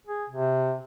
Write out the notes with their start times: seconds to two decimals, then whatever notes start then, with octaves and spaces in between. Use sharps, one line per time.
0.07 G#4
0.29 C3